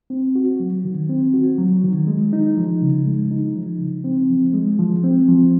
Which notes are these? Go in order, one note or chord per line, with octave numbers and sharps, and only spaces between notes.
C4
F#4
F#3
D#3
C4
F#4
F#3
D#3
G#3
D#4
F3
C#3
G#3
D#4
F3
C#3
C4
F3
G#3
F3
C4
F3